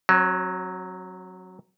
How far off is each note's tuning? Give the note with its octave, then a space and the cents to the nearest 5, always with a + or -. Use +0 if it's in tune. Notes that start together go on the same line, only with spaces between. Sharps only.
F#3 +0 C#4 -45